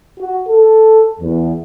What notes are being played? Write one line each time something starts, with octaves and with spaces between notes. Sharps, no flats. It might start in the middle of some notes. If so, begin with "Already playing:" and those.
F#4
A4
E2